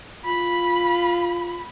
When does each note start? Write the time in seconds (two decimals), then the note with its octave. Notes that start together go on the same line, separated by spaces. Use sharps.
0.24 F4 B5